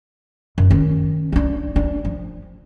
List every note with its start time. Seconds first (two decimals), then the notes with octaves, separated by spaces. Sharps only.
0.58 F#2
0.70 D#3 C#4
1.32 C#4 D4
1.76 D4
2.05 F3